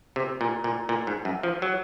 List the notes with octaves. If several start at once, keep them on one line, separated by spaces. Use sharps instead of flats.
C3
A#2
A#2
A#2
G#2
F#2
F3
F#3